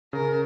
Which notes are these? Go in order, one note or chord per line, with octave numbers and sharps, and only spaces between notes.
C#3 A#4